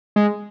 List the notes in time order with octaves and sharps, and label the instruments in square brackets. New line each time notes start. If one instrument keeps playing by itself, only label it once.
[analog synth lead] G#3